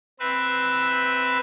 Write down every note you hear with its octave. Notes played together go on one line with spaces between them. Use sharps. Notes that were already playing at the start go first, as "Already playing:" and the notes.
C4 B4 E5